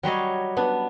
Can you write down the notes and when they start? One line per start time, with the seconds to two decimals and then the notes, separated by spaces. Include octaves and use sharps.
0.03 F#3 G3 C#5 D#5
0.57 B3 D4